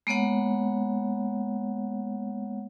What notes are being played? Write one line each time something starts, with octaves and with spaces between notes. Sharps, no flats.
G#3 A#3 B3 C#5 F#5